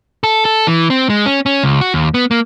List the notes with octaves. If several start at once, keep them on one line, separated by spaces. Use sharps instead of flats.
A4
A4
E3
C4
G#3
C#4
C#4
C#2
F#4
D#2
B3
A#3